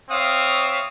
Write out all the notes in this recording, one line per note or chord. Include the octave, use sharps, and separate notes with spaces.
C4 C#5 E5 F5 D#6